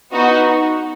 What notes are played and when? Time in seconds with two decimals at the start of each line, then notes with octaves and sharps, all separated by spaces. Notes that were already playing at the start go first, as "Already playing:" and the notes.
0.11 B3 D#4 F#4